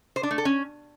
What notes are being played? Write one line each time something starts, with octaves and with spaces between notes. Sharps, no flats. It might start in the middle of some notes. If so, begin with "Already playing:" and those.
C5
D4
A3
A4
C#4